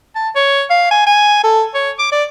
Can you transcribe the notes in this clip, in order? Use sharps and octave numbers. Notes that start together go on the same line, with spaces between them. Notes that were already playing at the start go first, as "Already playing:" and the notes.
A5
C#5
F5
G#5
G#5
A4
C#5
D6
D5